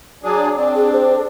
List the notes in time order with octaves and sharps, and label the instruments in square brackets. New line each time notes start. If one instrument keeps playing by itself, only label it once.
[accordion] F#3 D4 G#4
[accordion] C4 D4 [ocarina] D5
[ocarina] G#4
C5
A4